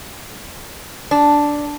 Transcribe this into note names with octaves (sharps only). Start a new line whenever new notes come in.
D4